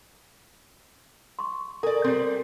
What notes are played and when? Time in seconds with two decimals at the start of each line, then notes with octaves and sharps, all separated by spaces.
1.39 C6 C#6
1.83 A4 A#4 D5 G#5
2.04 G3 C4